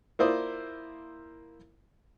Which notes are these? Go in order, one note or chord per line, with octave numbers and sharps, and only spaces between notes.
A#3 E4 F4 C5 D5 D#6